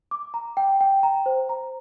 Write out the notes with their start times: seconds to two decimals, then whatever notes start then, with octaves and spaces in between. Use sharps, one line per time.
0.11 D6
0.34 A#5
0.57 G5
0.81 G5
1.03 A#5
1.26 C5
1.49 A#5